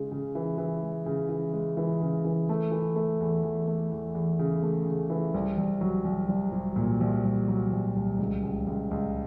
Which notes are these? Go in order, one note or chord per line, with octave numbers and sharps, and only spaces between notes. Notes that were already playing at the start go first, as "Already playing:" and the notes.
Already playing: C#3 G#3
C#3
E3
E3
G#3
C#3
E3
G#3
E3
C#3
E3
A3
E3
A3
E2
E2
A3
E2
E2
C#3
A3
C#3
E3
C2
C2
F#3
C2
C2
C2
A#2
C2
C2
F#3
C2
C2
C#2
C#2
C#2
C#2